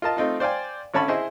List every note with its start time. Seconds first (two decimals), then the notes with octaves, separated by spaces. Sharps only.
0.02 F4 A#4 D#5 A5
0.17 A3 C4 D#4 F4
0.40 C5 D5 F5 G5 G#5
0.94 G#1 D3 C#4 C#5 A5 B5
1.08 E4 G#4 C5 D#5 E5